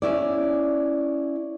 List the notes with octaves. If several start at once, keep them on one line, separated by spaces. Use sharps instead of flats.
C#4 E4 D5